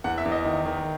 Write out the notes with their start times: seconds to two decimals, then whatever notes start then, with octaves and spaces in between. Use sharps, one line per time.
0.04 E2 F#5
0.18 E5
0.25 E2
0.32 D#5
0.45 D#3
0.66 D#3